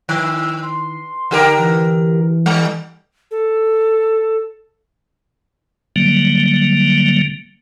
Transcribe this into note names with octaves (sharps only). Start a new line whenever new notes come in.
D#3 E6
C6
D3 G4 A#4
E3
G3
A4
D3 F#3 G3 A#3